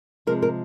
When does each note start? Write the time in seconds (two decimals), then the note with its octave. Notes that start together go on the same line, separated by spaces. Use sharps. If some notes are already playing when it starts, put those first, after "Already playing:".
0.27 C3 F3 G#3 A#4
0.42 A#4